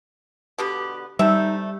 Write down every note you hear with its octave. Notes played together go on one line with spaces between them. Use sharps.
B2 D3 B3 G4
C3 G3 A3 D#4 E5